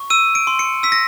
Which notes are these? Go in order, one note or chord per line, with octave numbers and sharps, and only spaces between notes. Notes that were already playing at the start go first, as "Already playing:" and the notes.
Already playing: C#6
E6 D#7
D7
C6
C#7
E6 B6
A#6